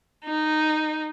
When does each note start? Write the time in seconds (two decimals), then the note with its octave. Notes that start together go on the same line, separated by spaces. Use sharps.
0.25 D#4